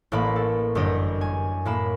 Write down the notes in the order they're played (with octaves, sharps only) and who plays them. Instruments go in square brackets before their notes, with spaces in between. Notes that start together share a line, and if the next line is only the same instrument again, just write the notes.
[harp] A1 A2 A#3 B5
A4
G1 F#2 G4 D#5
G#5
A2 A#3 B5 E7